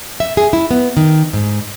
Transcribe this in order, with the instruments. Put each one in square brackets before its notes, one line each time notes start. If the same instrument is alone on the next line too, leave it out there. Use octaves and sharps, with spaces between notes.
[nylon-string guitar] E5
G#4
E4
B3
D#3
G#2